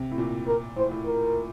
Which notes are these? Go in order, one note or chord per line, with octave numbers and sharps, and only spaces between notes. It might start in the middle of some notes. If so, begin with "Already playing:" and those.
Already playing: C3
A2
A#2
A#4
A2 C5
A2
A#4